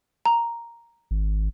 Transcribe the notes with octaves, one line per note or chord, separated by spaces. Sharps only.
A#5
G#1